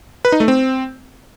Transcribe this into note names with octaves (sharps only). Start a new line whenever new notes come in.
B4
D#4
A3
C4